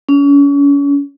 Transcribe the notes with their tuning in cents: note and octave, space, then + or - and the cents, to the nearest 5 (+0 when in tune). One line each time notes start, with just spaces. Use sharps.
C#4 +35